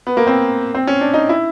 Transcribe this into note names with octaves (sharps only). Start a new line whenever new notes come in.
B3
A#3
C4
C4
C#4
D4
D#4
E4